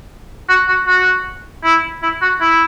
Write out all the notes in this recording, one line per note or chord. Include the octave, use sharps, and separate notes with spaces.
F#4
F#4
F#4
E4
E4
F#4
E4